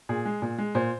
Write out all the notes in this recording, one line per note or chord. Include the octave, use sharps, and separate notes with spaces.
A#2 G#4
G#3
A#2
G#3
A#2 C5